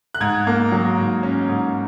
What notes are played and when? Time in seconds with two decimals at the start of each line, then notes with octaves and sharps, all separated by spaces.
0.14 F#6
0.21 G#2 G#6
0.47 A#3
0.72 F#3
0.98 G#2
1.23 C#4
1.49 G#2